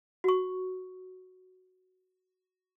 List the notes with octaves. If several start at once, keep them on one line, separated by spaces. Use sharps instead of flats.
F#4 C#6